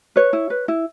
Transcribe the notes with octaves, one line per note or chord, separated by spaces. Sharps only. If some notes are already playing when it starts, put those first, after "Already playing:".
B4 C#5
E4
B4
E4